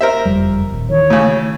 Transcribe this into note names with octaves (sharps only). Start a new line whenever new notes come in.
A#4 C5 E5
F#1 F2 G3
D#1
D#3 E3 C#5
A2 C#3